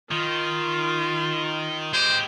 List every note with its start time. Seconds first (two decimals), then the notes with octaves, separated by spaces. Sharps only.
0.11 D#3 F4
1.93 G#3 G4 C5